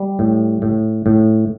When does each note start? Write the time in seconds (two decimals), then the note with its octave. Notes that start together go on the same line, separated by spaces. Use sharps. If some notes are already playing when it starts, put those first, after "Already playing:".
Already playing: G3
0.19 A2
0.62 A2
1.06 A2